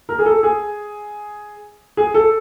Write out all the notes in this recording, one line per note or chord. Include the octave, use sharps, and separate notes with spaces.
A#4
G#4
A4
G#4
G#4
A4